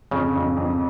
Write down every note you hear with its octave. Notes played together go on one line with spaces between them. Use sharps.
F2 C#3
F2
F2